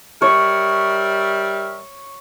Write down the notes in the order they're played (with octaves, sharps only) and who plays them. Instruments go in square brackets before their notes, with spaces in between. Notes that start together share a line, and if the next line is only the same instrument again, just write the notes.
[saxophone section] G3 A#4 E5 [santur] C#5